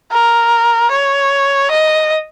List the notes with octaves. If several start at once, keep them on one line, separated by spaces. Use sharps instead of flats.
A#4
C#5
D#5